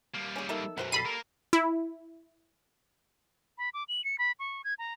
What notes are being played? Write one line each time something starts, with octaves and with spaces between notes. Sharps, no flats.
G3 A#3
C#4 G#4
D#3 A4 E5
B1 F#2 F#4 C5 F#5
G3 A4 B5 C7 D#7
A#3 A#4
E4
B5
D6
F#7
C#7
B5
C#6
G#6
A#5